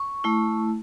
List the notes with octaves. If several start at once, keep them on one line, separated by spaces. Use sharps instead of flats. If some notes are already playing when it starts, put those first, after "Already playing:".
Already playing: C#6
A3 E4